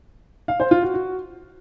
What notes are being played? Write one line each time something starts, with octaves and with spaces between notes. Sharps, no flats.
F5
C5
F4
F#4
F#4